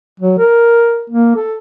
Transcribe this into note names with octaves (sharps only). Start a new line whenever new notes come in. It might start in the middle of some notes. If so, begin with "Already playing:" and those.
F#3
A#4
A#3
A4